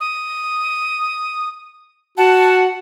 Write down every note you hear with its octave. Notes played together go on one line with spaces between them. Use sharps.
D#6
F#4 F#5 A5